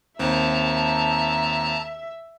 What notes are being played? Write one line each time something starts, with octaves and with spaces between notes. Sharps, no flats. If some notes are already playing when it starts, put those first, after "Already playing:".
D#2 C4 E5 A5 A#5